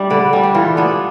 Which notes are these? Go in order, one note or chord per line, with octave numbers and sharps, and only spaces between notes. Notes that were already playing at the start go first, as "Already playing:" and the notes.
Already playing: G3 D4 E5
D3 B4 D5
G3 D4
G4
E3 F4 A4
B3 D4